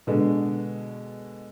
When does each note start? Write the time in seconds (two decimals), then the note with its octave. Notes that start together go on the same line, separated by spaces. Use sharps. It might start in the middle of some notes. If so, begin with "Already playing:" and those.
0.07 B2 D3 G#3